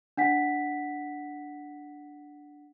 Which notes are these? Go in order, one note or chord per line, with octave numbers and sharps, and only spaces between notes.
D4 F#5 B6